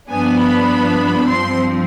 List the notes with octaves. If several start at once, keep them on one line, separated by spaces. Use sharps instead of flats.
G2 F3 B3 D4 G#5
B5
G2 F3 C4 C6